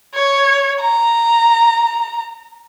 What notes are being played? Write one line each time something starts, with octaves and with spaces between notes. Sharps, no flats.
C#5
A#5